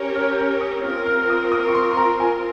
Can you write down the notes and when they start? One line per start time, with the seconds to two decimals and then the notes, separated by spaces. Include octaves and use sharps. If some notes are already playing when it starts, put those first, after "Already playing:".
Already playing: C#4 G4 A#4 C#5
0.16 F6
0.32 G6
0.39 F6
0.61 D#6
0.84 C4 F4 A#4 F6
1.06 F6
1.21 F6
1.30 D#6
1.52 D#6
1.68 C#6
1.74 C6
1.92 C6
1.97 A#5
2.20 G#5